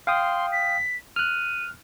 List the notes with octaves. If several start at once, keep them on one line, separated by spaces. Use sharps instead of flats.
F5 G5 C6 D#6
B6
F6 F#6 D#7